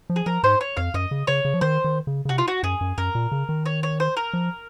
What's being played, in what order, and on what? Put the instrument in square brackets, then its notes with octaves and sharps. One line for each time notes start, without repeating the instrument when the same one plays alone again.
[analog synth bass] F3
[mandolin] G#4
[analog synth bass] F3 [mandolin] A#4
[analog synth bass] G#2 [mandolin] C5
[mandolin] C#5
[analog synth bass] F2 [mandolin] F5
[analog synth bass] F#2 [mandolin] D#5
[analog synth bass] C#3
[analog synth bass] C#3 [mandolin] C#5
[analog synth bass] C#3
F3
[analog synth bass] D#3 [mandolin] C5
[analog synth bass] D#3
C#3
C#3
[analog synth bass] C3 [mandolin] F#4
[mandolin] F4
F#4
[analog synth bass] F#2 [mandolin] G#4
[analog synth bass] F#2
[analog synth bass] F#2 [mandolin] A#4
[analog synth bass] A#2
C#3
D#3
[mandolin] C#5
C#5
C5
A#4
[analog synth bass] F3